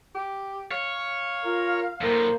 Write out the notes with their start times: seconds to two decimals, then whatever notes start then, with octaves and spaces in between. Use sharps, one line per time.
0.15 G4
0.71 C#5 F5
1.44 F4 A#4
2.01 D2 A2 A#3 C5